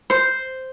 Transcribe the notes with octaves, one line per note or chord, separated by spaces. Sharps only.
C5